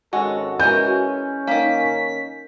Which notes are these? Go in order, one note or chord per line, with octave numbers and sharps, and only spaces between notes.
G#1 G#3 C#4 F#4 A4
E3 G#3 C#4 A#4 G6
D#3 A#3 B6